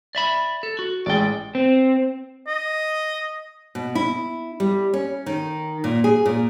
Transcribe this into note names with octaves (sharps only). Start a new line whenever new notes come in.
D5 E5 B5
A4
F#4
A1 G#3 D5 G5 A6
C4
D#5
B2
E4
G3
C#4
D#3
A#2
G#4
A#2